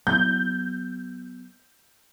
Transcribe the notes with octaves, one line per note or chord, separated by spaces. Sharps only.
F#3 B3 G6